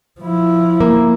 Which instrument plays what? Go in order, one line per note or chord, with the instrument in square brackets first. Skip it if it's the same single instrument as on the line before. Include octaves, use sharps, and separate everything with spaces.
[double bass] F3 E4
[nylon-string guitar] A#3